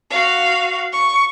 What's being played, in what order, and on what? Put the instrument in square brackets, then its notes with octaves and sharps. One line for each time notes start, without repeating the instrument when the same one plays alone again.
[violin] F#4 F5
C#6